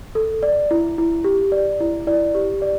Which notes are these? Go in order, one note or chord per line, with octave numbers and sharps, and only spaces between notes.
A4
D5
E4
E4
G4
D5
E4
E4 D5
G4
D5